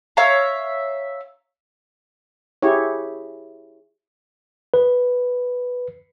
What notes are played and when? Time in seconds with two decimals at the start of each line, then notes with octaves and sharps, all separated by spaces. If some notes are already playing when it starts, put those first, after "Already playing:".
0.17 C#5 E5 F5 A#5
2.62 E4 G4 G#4 C#5
4.74 B4